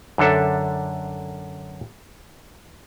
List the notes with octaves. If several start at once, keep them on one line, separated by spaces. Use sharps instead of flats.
F#2 D3 D4 A4 E5